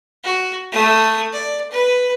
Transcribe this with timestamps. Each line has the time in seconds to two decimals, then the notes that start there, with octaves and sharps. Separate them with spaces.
0.24 F#4
0.72 A3 D#6
1.32 D5
1.71 B4